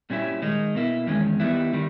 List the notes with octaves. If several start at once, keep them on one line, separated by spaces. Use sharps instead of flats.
A#2 G3 C#4 E4
D#3 G#3 D#4
B2 A#3 E4
E2 D#3 G#3 C#4
D#3 G3 B3 E4
D#3 G3